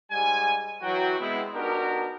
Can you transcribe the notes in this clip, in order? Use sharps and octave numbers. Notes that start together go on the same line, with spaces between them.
G#2 G3 G#5
E3 F#3 F#4 G5
G#3 B3 C4 E4
B3 D4 D#4 F#4 G4 A#4